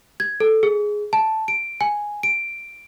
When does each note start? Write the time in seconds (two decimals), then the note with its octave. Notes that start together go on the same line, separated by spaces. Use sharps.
0.20 G#6
0.40 A4
0.63 G#4
1.13 A5
1.48 D7
1.81 G#5
2.23 D7